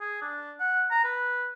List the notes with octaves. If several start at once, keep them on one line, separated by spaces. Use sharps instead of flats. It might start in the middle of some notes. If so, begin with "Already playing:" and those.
G#4
D4
F#5
A#5
B4